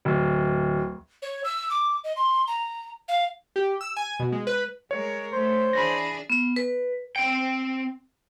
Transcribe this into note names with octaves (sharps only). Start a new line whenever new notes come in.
D1
C#5
E6
D6
D#5
C6
A#5
F5
G4
E6
G#5
B2
G#3
B4
G#3 A#4 C#5
A3 C5
E3 D4 G#4 B5 A#6
B3
B4
C4 G5